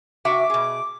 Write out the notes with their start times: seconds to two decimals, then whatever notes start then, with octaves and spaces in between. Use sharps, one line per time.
0.25 C3 F#4 E5 D6
0.50 B2 G#4